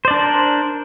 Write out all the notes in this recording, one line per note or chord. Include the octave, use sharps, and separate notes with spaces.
D4 A#4 C5 D5